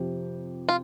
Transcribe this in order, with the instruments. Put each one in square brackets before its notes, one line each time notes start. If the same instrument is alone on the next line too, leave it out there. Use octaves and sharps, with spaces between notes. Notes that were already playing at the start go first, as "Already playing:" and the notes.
Already playing: [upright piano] F2 C3 F3 C4 G4
[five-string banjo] F4